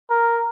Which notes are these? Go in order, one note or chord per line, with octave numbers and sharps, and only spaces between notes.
A#4